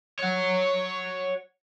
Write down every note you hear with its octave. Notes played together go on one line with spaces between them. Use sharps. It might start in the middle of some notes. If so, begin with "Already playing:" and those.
C#5 F#5